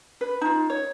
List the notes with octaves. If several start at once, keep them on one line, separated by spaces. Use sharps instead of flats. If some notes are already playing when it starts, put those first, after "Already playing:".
B4
D#4 F4
C#5